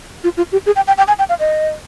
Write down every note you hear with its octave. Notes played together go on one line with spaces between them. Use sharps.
F4
F4
G4
G#4
G5
G5
G5
G#5
G5
F5
D#5